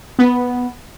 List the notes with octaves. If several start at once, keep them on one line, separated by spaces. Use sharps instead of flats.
B3